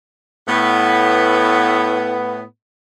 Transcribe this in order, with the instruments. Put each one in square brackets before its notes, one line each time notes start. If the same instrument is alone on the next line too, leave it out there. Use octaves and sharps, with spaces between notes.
[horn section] A2 B3